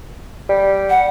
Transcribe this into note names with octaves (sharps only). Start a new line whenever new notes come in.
G3
F#5